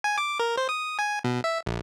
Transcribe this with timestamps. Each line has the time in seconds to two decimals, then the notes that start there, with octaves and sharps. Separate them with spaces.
0.04 G#5
0.18 D6
0.40 A#4
0.57 C5
0.69 D#6
0.99 G#5
1.24 B2
1.44 E5
1.66 A#1